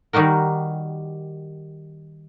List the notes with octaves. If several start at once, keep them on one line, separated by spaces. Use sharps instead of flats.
D#3 G3 D#4 F#4 A#4